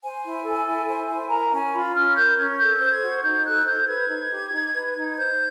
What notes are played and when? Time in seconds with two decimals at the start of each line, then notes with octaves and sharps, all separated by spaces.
0.02 C5 G#5
0.24 E4
0.44 A4
0.67 E4
0.88 C5
1.09 E4
1.30 A#4 A#5
1.52 C#4 G#5
1.73 F4 B5
1.95 C#4 F6
2.16 A#4 G6
2.38 C#4 G#6
2.59 A4 G6
2.81 C5
2.91 G#6
3.02 F#4
3.23 D#4 G6
3.45 A4 F#6
3.66 C5 G6
3.88 B4 G#6
4.10 D#4
4.31 G4
4.52 D#4
4.74 B4
4.95 D#4
5.17 C5 G6